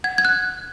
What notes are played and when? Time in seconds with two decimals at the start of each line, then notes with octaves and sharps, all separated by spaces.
0.04 F#5 G#6
0.18 G#6
0.25 F#6